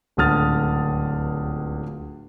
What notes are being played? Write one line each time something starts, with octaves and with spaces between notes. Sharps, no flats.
D1 C#2 D3 D#6 F6 A6